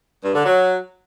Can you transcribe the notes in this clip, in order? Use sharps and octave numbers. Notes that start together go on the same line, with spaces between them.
G2
D3
F#3